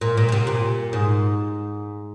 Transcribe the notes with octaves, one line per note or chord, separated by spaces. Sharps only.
A#2
A#2
A#2
C3
A#2
G#2